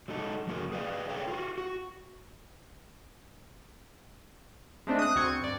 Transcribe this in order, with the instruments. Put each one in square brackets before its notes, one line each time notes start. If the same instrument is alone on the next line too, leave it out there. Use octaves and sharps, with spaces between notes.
[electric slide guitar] F#3 G#3 D#4 A4
F2 F#3 A#3 F#4 G#4 A#4
G#4 B4 D5 E5 F5
G#4 A4 B4 C#5 G5
F4 F#4
F#4
[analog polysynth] G#3 A3 C4 D4
D#6 F#6
D2 C4 C#6 G#6
G#6
G2 D5